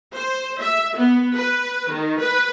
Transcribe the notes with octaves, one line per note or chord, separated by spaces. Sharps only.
C5
E5
B3
B4
D#3
B4